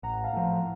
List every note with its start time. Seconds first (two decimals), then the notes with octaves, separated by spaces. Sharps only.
0.03 A1 F#5 A#5
0.23 F5 A5
0.33 A2 F3